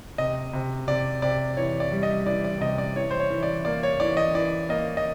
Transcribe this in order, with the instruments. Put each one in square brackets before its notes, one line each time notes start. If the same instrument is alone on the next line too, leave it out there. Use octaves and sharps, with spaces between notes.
[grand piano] C3 D#5
C3
C3 D5
C3 D5
E3 C#5
D5
G3
D#5
E3 D5
D5
C3 D#5
D5
E3 C#5
C5
C#5
E3
D5
A#3 D5
C#5
E3 D5
D#5
E3 D5
A#3 D#5
D#5